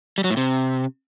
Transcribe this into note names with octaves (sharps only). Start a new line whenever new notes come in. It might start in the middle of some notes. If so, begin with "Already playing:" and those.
G3
F#3
A2
C3